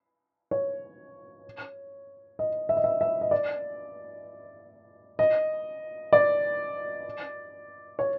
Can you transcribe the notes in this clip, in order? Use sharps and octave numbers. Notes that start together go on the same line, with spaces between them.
C#5
D#5
E5
D#5
E5
E5
D#5
D5
D#5
D5
C#5